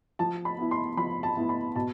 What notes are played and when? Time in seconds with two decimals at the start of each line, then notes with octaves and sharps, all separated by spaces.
0.19 F3 A5
0.45 B5
0.58 B3 E4
0.71 C6
0.97 F3 B5
1.23 A5
1.37 B3 E4
1.49 B5
1.76 B2 A5